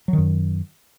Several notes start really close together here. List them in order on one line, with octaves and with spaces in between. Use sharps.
F#3 D#3 F#2